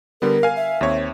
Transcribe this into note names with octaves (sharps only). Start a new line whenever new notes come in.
D3 G3 B3 A#4
F5 G#5
E5
D#2 C4 C#5